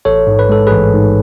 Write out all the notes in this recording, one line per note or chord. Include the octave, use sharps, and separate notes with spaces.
A1 A4 C#5
G#2
B4
G#3 A4
A1 G#4 B4
G#2